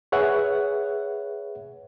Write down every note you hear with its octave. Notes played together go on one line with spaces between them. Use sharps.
G#4 B4 C#5 E5 F#5